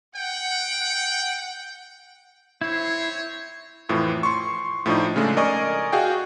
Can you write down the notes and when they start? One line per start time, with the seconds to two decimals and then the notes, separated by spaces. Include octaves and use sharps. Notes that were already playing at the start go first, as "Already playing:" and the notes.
0.16 F#5 G5
2.61 C4 E4 C5 C#5
3.89 F2 A2 E3 F3
4.23 C6 C#6
4.86 A2 F3 D4 D#4
5.16 C#3 G#3 A3 D4
5.37 A#4 D5 D#5 G#5 C#6 D#6
5.92 F#4 G#4 F5 G5